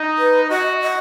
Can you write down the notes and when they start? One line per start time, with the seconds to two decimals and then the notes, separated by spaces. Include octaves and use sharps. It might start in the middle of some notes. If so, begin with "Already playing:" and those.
Already playing: D#4
0.18 B4
0.50 F#4 D#5
0.82 D#5